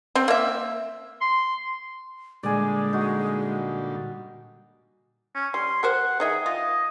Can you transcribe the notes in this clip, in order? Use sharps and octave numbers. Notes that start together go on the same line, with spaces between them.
C4
A#3 E5
C6
A#2 D3 G3 G#3 D5 G#5
D#4 F#4
C#4
G3 C6
G4 A#4 C5 F#5
D#3 G#4 D#5 E5
F4 D#5